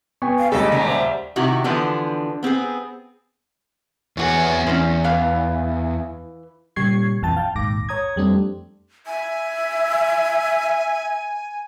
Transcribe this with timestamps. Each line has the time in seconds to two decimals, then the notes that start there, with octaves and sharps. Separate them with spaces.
0.22 B3 G5 G#5 C#6
0.39 F5
0.52 D#2 C#3 G#3 A4 D#5
0.72 A#2 C#3 F#3 G3
0.88 C5 D5 E5
1.36 C3 D#3 E4 F#4 G4
1.64 D3 E3 F3 B3 D4
2.43 B3 C4 G4 G#4
4.17 E2 B3 F#4 G#4 C#5
4.67 E2 C4 C#4
5.04 E3 F5
6.76 A#2 C#3 G3 C#6 G#6 C7
7.22 A#1 F2 E3 G5 A5 A6
7.36 F5 G5 A5
7.55 A#1 D#2 G#2 D6 A#6
7.89 C#5 A#5 D#6 G#6
8.16 F2 G3 A3 C4 D4
9.07 E5 G#5